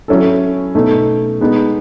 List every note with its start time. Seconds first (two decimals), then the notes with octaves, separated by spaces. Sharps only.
0.08 F#3 C#4 E4 A4
0.75 B2 A3 D#4
1.41 G#3 B3 D#4